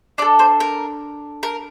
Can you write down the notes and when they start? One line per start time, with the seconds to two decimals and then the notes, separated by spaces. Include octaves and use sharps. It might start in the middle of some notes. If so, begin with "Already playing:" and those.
0.18 D4 D5
0.22 A4
0.39 C5
0.60 A#4
1.43 A#4